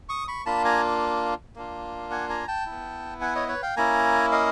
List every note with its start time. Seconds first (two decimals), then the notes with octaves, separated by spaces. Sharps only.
0.09 C#6 D#6
0.28 B5 C#6
0.46 A#3 D4 F4 A5 B5
0.65 G#5 A#5
1.56 A#3 D4 F4
2.11 F#5 G#5
2.29 G#5 A#5
2.48 G5 A5
2.66 B3 E4
3.21 F#5 G#5
3.35 C#5 D#5
3.48 B4 C#5
3.62 F5 G5
3.76 A#3 C#4 E4 G#5 A#5
4.32 D#5 F5